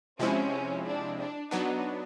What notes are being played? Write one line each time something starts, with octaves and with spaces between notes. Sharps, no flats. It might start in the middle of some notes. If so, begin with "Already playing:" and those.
C3 F3 G#3 C4 C#4 E4
D4
D4
F#3 B3 D4 D#4